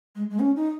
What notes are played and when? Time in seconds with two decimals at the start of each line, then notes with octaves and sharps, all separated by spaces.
0.16 G#3
0.30 G#3
0.40 C#4
0.56 D#4